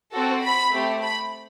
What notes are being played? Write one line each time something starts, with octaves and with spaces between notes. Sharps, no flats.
C4 F#4 A4
B5
A3 C4 G4
B5